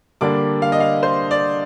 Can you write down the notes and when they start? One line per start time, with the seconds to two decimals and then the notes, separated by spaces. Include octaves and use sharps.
0.21 D3 G3 A#3 D4 D6
0.62 F5
0.72 D#5
0.80 F5
1.03 C5
1.31 D5